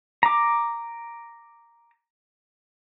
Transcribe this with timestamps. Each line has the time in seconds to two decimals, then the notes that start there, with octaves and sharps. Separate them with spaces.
0.23 A#5 D6